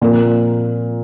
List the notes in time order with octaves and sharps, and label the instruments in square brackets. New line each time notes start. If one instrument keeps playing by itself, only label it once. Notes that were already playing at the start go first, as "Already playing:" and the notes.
[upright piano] A#2 [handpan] F3 C4 F4 A#4